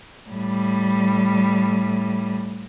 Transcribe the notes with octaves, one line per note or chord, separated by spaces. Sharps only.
A2 G3